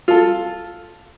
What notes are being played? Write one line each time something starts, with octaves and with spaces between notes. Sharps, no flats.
F4 A4